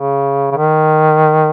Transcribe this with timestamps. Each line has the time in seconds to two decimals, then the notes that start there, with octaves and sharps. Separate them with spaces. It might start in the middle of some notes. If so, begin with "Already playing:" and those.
Already playing: C#3
0.52 C#3
0.57 D#3